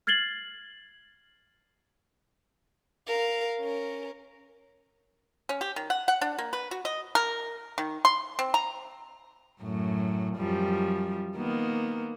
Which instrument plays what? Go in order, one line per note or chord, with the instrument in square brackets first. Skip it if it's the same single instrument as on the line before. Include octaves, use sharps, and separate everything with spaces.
[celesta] F6 G#6 A6 C7 F#7 G7
[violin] A#4 F5
C#4 A#4
[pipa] C#4
G4
D#3
F#5
F#5
D4
A#3
B4
F#4
D#5
A#4
D#3
C6
C4
A#5
[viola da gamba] F#2 A2 F#3
F#2 F3 G3
D#3 A#3 B3